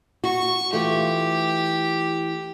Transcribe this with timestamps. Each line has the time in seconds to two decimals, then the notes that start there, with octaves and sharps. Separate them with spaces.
0.24 F#4 C#6
0.73 E3 A3 F4 G4